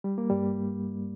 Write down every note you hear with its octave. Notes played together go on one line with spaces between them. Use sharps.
G3
A#3
G2 G3